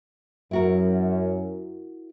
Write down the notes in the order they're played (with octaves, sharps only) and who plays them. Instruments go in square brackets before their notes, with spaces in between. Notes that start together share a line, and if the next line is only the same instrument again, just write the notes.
[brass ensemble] F#2 [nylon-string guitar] E4 F#4 A#4